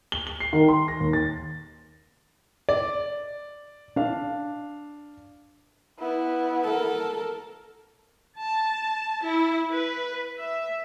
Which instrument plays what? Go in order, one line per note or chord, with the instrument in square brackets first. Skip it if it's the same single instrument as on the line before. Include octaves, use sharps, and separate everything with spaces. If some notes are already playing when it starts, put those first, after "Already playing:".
[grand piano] G7
G7
C7
D#3
C6
A#6
D#2
A6
D5
D4 F5
[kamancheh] B3 E4
[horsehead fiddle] A4 A#4
[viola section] A5
E4
B4
E5